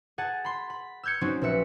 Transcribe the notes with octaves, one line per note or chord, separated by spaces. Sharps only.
G#4 F#5 A5
B5 C6
B5
E6 F6 G6 G#6 C#7
F#3 C4 C#4 D#4 F#4
A#1 B4 E5 C#7